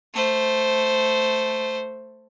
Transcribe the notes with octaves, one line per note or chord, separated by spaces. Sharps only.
A3 C5